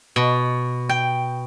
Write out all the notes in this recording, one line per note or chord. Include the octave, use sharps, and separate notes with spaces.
B2
G5